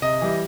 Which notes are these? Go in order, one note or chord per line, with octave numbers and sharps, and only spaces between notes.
C3 D#5
E3 G3